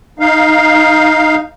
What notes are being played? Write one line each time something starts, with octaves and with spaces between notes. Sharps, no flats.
D#4 F5